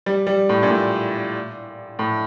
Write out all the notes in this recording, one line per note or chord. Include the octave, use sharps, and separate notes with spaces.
G3
G3
A2
A#2
A2
A2